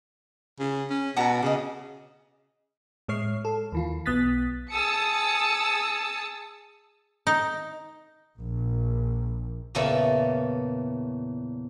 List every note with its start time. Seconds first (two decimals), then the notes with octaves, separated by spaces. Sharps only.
0.59 C#3
0.90 C#4
1.17 B2 F#5 A5 A#5
1.43 C#3 D#5 D6
3.08 A2 G#3 C#5 F6 C7
3.45 A4
3.72 D#2 E3 F4
4.06 B1 B3 D#6 F#6 A6 B6
4.71 G#4 A5 D#6 E6 A6 C#7
7.27 D#4
8.38 A#1
9.75 E2 A#2 C#3 E3 C#4 A4